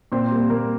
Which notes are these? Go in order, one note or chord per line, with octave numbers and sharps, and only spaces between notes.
A#2 C4 C5
G3 A#3
A#2 A#3 A#4